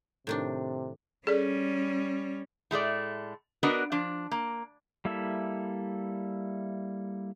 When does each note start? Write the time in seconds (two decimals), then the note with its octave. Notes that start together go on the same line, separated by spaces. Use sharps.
0.27 A2 C3 D#3 D4
1.27 G3 C#4 G#4 A4 D5
2.71 A2 G#3 A3 D5
3.63 B3 D4 F#4 A#4 B4 D#5
3.92 F3 D4
4.31 A#3
5.05 G3 A#3 E4 A4 E5